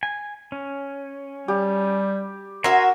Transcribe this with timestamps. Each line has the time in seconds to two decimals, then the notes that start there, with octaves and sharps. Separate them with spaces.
0.03 G#5
0.52 C#4
1.48 G3 G4
2.64 F#4 A#4 E5 G#5 A#5 C6